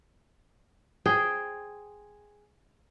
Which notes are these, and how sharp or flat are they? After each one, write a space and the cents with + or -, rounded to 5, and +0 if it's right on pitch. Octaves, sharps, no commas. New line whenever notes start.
G#4 +0 C5 +0 G5 +0